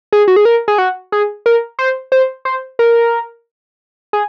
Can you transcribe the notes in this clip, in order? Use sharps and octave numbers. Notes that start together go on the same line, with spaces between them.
G#4
F#4
G#4
A#4
G#4
F#4
G#4
A#4
C5
C5
C5
A#4
G#4